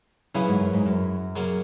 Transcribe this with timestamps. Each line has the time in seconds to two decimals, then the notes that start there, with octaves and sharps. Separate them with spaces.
0.34 C#3 E3 F#3 C#4 E4 G#4 B4
0.48 G#2
0.60 F#2
0.73 G#2
0.85 F#2
1.36 C#3 F#3 A#3 C#4